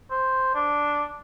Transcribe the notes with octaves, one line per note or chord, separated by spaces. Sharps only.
C5
D4